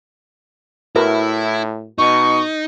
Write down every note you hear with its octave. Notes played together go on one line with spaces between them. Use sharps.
A2 E4 F#4 A#4 B4
B2 D#4 C#6